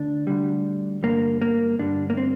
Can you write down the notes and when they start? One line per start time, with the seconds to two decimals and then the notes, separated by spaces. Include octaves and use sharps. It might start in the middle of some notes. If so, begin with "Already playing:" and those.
Already playing: D2 D3 D4
0.27 D2 D3 G3
1.03 G2 D3 G3 A#3
1.42 A#3
1.79 G2 D3 G3 D4
2.10 A#3
2.17 C4